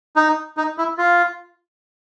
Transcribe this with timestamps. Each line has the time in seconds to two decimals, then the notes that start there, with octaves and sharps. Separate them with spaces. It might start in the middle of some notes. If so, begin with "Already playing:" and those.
0.16 D#4
0.57 D#4
0.78 E4
0.98 F4